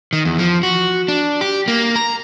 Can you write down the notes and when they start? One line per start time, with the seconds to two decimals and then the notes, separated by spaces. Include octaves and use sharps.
0.13 D#3
0.25 E2
0.39 F3
0.63 F#4
1.08 D4
1.41 G4
1.68 A#3
1.96 A#5